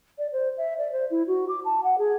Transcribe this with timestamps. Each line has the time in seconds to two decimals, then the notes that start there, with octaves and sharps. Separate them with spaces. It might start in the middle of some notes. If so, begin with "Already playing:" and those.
0.18 D5
0.32 C5
0.57 E5
0.78 D5
0.91 C5
1.10 E4
1.27 F#4
1.48 D6
1.65 A5
1.83 F#5
1.98 G#4